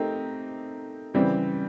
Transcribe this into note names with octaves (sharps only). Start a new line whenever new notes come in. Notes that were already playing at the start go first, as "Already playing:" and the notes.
Already playing: A3 C4 D#4 G4 A#4
C#3 E3 G3 C4